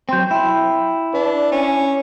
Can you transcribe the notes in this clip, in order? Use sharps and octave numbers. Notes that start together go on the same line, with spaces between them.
F#3 C4 G5 C6 G6
E4 G5
D4 B4
C#4